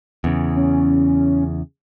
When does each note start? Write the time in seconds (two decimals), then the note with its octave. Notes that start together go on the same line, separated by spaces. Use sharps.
0.24 E2 C#3
0.55 C#4